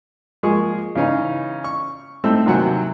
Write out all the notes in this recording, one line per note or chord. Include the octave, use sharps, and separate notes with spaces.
F3 G#3 A#3 G#4 C#6
C#3 E3 C#4 D#4
C#6
A2 A3 C4 D#4 E6
D#2 C3 F#3 F#5 G#5